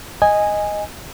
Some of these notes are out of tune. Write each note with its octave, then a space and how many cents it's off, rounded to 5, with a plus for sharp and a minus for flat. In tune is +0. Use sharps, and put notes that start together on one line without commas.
D#5 +0 G#5 -10